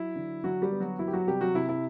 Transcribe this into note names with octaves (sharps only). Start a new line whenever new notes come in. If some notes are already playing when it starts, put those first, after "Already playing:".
Already playing: F#3 E4
D3
D3 F#3 F#4
G3 G4
B3
F#3 F#4
F#3 E4
G4
F#3 F#4
C3 G3 G4
F#3 F#4
C3 E4
E4